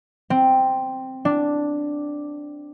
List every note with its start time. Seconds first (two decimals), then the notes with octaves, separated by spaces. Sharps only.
0.30 C4
1.25 D4